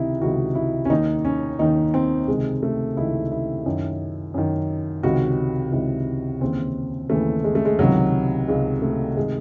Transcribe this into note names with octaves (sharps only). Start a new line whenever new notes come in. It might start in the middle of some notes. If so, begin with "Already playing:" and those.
Already playing: C#2 C3 D#3 D#4 E4
C#2 C3 D#3 F#4
E4
C#4
D#2 D#3 D#4
C#4
D#2 D#3 D#4
C4
C#2 C3 D#3 G#3
A3
C#2 C3 D#3 E4
E4
F#2 D#3
F#2 D#3
C#2 C3 D#3 F#4
C#2 C3 D#3 E4
D#2 C#3 E3 C4
D#2 C#3 E3 A3
G#3
A3
G#3
C#2 C3 D#3 F#3
C#2 C3 D#3 G#3
A3
C3 D#3 G#3